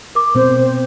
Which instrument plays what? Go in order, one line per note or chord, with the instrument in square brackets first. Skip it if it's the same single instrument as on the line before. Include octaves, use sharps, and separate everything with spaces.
[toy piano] A#4 D6
[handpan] B2 C4 [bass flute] C5